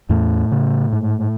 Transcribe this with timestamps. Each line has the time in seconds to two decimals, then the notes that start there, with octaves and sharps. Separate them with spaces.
0.09 E2 A2 A3
0.51 C#3
0.92 G#2